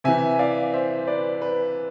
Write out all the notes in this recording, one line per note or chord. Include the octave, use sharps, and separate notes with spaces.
C3 E3 E5 G#5
D5 F5
C5 E5
C5
B4 D5
B4